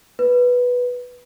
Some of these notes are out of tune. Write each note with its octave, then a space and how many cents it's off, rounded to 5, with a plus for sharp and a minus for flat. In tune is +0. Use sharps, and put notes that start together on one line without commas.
B4 -5